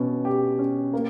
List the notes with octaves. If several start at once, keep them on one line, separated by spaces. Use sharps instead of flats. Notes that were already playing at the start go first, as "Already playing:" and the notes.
Already playing: B2 C#4
G4
C#4
A#3